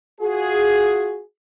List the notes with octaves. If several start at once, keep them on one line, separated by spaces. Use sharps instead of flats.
F4 F#4 G#4